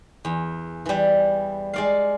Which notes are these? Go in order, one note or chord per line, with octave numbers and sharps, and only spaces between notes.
E2
E3 G3
G#3 D5 F5